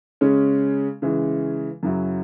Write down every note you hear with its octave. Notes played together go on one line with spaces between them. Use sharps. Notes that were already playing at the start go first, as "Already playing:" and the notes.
C#3 G#3 C#4
C#3 E3 G#3
F#2 C#3 F#3 E4